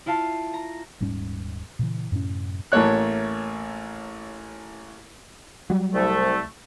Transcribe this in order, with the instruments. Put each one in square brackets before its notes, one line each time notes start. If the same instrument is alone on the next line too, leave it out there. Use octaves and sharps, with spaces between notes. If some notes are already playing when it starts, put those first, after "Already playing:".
[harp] E4 F4 F5 A5
A#5
[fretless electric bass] D#1 G#2 G3 C#4
A#2 C#3 E3
F#2 A2 C3 C#4
[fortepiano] A1 A3 A#3 C#5 F#6
[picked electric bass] F#3 G3
[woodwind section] C2 A3